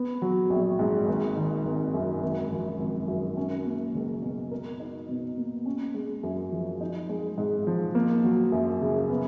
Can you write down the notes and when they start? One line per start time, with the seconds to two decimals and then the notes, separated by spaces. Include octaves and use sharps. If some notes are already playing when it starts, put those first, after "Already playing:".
Already playing: B3
0.22 F#3
0.50 A#1
0.79 G#2
1.08 G#1
1.37 D#3
1.65 G#1
1.94 F#2
2.23 G#1
2.51 F3
2.80 G#1
3.08 F#2
3.37 C#4
3.66 A#3
3.95 C#2
4.23 B2
4.51 A#4
4.80 D#4
5.09 B2
5.38 A#3
5.66 C#4
5.94 G#3
6.23 F#2
6.52 F3
6.81 D#4
7.09 G#3
7.38 G#2
7.67 F3
7.95 A#3
8.24 F#3
8.52 F#2
8.81 C#3
9.10 B3